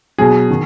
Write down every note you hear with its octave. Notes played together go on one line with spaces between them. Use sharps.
B2 F#3 G#4
D#3